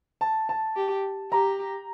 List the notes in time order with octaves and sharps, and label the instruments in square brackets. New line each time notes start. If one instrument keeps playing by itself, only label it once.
[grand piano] A5
A5
[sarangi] G4
[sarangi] G4 [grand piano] A#5